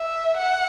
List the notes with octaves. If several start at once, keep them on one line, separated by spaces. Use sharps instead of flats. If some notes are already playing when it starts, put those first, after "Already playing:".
Already playing: E5
F#5